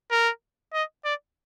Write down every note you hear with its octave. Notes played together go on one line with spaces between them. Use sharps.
A#4
D#5
D5